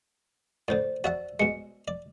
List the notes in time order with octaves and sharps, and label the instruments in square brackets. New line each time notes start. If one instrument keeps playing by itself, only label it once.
[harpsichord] A2 D3 [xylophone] C5 D5
[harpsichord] F#4 E5 F#5 [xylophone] D5
[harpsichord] B2 G#3 [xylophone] C#7
[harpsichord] D5